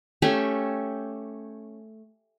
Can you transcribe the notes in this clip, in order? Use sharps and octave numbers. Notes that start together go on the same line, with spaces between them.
A3 C#4 G4 E5